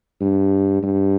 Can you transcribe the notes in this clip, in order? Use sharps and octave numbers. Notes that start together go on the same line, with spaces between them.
G2
G2